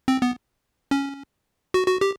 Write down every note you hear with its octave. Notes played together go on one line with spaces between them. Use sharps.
C4
B3
C#4
F#4
F#4
G4